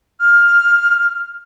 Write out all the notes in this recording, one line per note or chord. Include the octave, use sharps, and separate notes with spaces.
F6